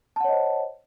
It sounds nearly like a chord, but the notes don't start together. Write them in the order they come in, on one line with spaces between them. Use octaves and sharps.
A5 F#5 C#5 D#5 C5